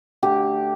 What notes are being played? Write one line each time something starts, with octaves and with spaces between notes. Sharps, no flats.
D3 A3 G4